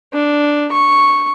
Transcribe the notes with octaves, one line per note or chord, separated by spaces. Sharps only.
D4
C#6